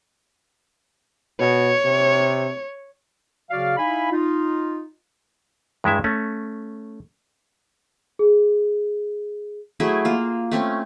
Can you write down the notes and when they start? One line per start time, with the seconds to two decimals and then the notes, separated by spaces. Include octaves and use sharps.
1.40 B2 C#5
1.85 C3
3.50 C#3 F#3 F#4 D5 F5
3.77 D#4 E4 F5 G#5 B5
4.11 D#4 F4
5.84 G2 G#3 E4 E5
6.04 A3 C#4
8.19 G#4
9.80 F#3 A3 E4 G#4
10.05 A#3 F4
10.51 A3 C4 C#4